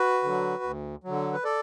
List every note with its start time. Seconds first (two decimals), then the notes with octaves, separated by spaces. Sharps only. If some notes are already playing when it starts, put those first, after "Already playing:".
Already playing: F#4 B4
0.23 D3 F#3
0.63 D2
1.04 D3 F#3
1.33 B4
1.44 A4 D5